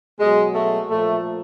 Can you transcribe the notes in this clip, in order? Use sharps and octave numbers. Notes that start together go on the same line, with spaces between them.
B2 F#3 G#3
A3
A#2 F3 A3